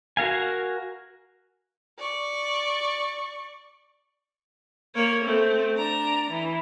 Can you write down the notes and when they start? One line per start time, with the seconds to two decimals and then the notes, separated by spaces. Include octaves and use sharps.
0.17 F#4 A#4 F5 G#5
1.98 D5 C#6
4.95 A#3 C#5
5.24 A3 C4
5.76 D4 A#5
6.31 E3